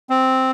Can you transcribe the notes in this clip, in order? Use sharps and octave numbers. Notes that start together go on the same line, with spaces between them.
C4